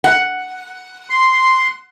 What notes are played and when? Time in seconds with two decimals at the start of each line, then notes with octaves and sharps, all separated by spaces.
0.04 F#5
1.10 C6